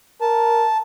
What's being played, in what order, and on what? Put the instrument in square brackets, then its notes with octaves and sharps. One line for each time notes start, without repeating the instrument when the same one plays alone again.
[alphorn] A#4 [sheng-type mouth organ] A5